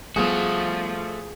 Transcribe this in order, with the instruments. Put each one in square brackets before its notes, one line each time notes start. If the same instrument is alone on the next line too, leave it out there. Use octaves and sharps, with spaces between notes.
[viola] F3 [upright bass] G3 B3 [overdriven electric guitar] A3 F#4 [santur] G#4